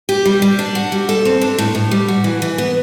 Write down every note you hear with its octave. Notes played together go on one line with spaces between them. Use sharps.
G4
G3
G3
D4
F#4
G3
A4
C4
D4
A2
A2
G3
F#4
E3
E3
B3